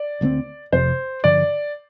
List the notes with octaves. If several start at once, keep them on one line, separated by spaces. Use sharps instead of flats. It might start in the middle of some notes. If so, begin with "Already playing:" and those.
Already playing: D5
D2 D3 A3 C4
F1 F2 C3 C5
G2 D3 F3 D5